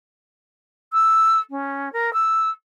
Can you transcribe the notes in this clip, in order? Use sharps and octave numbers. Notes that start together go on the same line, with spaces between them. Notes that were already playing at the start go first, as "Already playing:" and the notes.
E6
C#4
A#4
E6